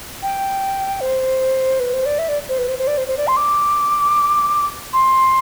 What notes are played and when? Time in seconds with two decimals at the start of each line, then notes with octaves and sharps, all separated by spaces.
0.23 G5
1.01 C5
1.80 B4
1.93 C5
2.06 D5
2.19 E5
2.29 D5
2.49 C5
2.58 B4
2.68 C5
2.78 C5
2.87 D5
2.98 C5
3.08 C5
3.17 D5
3.27 C6
3.37 D6
4.93 C6